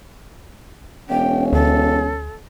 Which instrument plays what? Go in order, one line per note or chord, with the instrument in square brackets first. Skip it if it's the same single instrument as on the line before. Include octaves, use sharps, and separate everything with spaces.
[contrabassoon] E1 [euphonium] C#4 [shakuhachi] G5
[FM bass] D2 [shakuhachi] A4